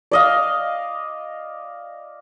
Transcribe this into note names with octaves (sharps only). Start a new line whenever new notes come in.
D5 D#5 F5